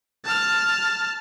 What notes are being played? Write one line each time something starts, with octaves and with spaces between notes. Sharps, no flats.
A5 F6